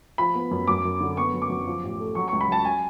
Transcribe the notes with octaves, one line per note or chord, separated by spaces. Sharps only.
F3 B5
B3
F#2
F#2 D6
F#2
D3
B3 C#6
F#2
D6
F#2
F3
A1
A3
F#3 C#6
C#2 C#6
B5
F#3 A5
G#5